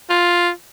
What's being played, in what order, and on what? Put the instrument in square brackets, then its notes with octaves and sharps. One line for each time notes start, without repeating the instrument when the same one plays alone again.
[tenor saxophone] F4